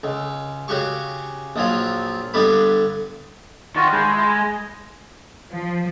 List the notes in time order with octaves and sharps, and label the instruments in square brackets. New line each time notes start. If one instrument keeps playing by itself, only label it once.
[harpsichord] C#2
C#3 F#4 G4 C#6
A#1 F3 F#3 F4
G2 D3 B3 G4 B5
[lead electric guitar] D#3 [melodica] F4 F#4 D5
[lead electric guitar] G#3 [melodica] E4 C5
[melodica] E4 F4 D#5
D#5
[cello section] F3